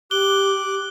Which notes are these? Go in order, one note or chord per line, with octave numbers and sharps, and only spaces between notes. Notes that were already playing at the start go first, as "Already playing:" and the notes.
G4 D6 F#6 G7